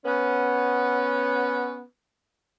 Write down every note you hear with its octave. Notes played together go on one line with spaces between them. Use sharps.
B3 C#4